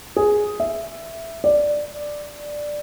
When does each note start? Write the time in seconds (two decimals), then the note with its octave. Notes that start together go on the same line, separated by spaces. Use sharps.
0.16 G#4
0.60 E5
1.44 D5